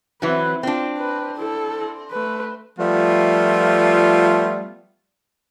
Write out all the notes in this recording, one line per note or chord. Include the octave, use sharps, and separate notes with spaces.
E3 F#3 C4 B4
C4 D4 F4
B4
E4 A4
A3 B4
F3 G3 A3 B3 F4